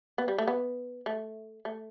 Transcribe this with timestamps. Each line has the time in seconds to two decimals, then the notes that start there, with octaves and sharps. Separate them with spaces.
0.18 B3
0.28 G3
0.38 A3
0.48 B3
1.06 A3
1.65 A3